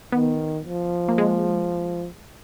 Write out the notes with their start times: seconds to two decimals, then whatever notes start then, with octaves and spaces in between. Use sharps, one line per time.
0.12 D#3 B3
0.65 F3
1.09 A#3
1.18 G#3